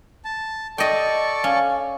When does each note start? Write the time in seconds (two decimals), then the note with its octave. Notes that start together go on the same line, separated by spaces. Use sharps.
0.25 A5
0.78 A4 D5 D#5 G5 C#6
1.44 C#4 F5